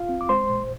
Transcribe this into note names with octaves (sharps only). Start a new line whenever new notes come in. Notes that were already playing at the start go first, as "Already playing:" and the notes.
Already playing: F4 F5
C4
D6
G#3 C5 C6
A#2